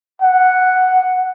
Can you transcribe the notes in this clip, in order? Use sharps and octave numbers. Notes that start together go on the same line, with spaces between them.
F#5